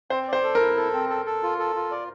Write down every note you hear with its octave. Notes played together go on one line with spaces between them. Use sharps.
C4 C5
C5 D5
A4
A#4
E4
A4
C4
A4
A4
F4
A4
F4
D5